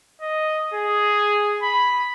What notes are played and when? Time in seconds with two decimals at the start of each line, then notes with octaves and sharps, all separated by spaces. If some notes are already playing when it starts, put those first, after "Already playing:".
0.21 D#5
0.74 G#4
1.63 B5